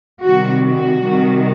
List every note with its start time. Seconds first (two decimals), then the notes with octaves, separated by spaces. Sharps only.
0.23 C3 D#3 G3 F#4
0.64 F#4
1.02 C3 D#3 G3